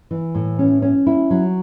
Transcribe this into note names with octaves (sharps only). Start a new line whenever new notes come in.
E3
A2
C#4
C#4
E4
F#3